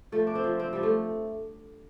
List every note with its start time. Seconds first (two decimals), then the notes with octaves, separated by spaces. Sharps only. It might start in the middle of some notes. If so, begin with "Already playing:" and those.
0.12 F3 A3
0.27 D4
0.35 C4
0.44 F3
0.60 C4
0.73 F3 G3
0.83 A3